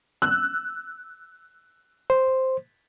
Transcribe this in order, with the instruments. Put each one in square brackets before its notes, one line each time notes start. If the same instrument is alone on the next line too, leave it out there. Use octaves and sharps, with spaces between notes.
[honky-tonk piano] E6 F#6
[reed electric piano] C5